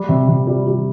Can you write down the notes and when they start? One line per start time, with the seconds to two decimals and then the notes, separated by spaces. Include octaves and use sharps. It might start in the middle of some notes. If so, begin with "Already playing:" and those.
Already playing: G3
0.09 C3
0.28 C3
0.47 G3
0.67 G3